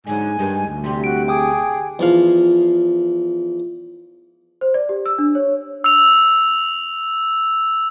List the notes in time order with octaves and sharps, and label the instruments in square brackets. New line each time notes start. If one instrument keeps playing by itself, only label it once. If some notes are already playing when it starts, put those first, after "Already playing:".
[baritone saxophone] G#2 [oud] D3 F#3 [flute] G#5
[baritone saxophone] G2 [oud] D#3 G#3
[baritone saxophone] D2
[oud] C3 G3 [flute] C6
[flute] F#4 [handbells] D7
[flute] G#4 [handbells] G5 D6 D#6
[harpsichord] E2 F3 F5
[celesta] C5
D5
G4
E6
D4
C#5
[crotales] E6 F7